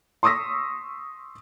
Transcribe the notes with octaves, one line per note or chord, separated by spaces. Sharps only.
C6 C#6 D#6 E6 A#6 B6